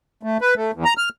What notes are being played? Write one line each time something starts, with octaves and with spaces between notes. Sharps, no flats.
A3
B4
A3
E2
A#5
F6